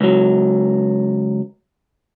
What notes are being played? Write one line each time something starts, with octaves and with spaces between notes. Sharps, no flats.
C#2 F#3